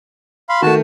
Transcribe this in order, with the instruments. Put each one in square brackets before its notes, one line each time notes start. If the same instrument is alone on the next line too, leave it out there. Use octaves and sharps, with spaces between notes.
[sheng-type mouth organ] F5 B5 C6
[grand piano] D#3 A3 [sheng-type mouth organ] F#4 A5